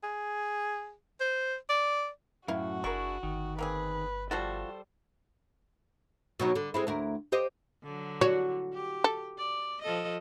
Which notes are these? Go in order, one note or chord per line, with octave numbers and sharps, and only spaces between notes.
G#4
C5
D5
F#2 A2 E4 F#4 F5
F#1 D4 E4 G#4 A#4 C#6
G1 D#3
A#3 C4 G#4 B4
F3 G3 F4 F#4 A4 C5
B2 F#3 D#4
D3
G#3 C4 E4
D2 E4 A#4
G4 C5 D#5
D3 F#3
F#4 C#5
G4
A4
D5
F3 A4 D#5